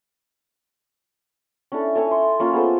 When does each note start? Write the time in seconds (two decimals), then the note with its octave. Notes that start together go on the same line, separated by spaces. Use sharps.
1.72 C#4 D4 E4 A4
1.95 A4 C#5 E5 G#5
2.11 C6
2.40 A#3 C#4 F4
2.53 B3 G#4 A4 C5